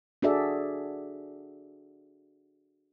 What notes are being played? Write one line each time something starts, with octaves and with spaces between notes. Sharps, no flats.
D4 F#4 G#4 A4 D5 E5